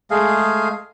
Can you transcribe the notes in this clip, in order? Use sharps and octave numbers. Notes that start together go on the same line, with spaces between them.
G#3 A3 G#4 F5